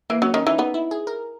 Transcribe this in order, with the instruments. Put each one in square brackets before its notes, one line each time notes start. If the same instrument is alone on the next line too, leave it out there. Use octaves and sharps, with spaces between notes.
[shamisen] E3 [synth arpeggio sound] A#3
[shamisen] F#3 [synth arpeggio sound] C#4
[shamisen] D#3 [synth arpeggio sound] C#4
[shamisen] E3 [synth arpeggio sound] D#4
[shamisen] B3 [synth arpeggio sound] D#4
[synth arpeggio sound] E4
G#4
A#4